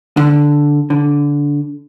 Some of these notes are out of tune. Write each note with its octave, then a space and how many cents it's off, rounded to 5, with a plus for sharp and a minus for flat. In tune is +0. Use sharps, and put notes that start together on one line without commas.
D3 -5
D3 -15